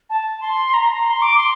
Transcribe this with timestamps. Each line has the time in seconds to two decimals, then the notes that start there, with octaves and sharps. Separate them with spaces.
0.10 A5
0.41 C6
0.74 A#5
0.90 A#5
1.06 C6
1.22 D6
1.38 C6